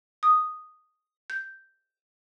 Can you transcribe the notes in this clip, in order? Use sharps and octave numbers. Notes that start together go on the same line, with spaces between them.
D#6
G6